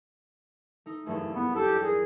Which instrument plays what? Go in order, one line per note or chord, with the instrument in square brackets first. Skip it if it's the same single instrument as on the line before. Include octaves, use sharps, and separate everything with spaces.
[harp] A3 D#4
[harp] F#1 E2 G2 [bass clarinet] A3
[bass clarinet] B3
[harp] D4 G6 [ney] G4 [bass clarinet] A4
[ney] G#4 [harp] A#4 D#6